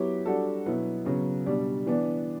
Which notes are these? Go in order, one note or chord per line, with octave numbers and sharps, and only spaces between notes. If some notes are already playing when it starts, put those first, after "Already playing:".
Already playing: F#3 B3 E4 G4 C#5
G3 D4 F#4 A4
B2 F#3 B3 E4
C#3 F#3 B3
B2 G3 D4
E3 B3 D4